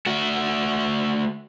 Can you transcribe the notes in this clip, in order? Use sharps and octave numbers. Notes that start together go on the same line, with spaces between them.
A3 F#4